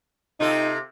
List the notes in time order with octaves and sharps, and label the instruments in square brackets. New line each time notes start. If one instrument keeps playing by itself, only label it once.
[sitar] C3 F4 A4 [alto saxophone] D#4